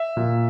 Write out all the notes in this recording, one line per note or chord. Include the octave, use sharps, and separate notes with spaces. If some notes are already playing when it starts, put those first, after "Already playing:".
Already playing: E5
A#2